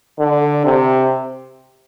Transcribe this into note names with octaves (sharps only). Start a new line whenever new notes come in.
D3
C3